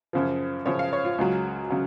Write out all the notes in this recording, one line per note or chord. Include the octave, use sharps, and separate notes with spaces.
F#2 C#3 F3
F#2 C#3 F3 C#5
F5
C#5
F4
C#2 C#3 F#3
C#3 F#3